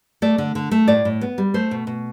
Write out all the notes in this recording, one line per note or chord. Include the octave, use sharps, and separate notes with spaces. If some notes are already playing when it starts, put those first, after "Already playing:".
A3 D5
D3
D3
A3
A2 D5
A2
B3
G3
A3 C5
B2
B2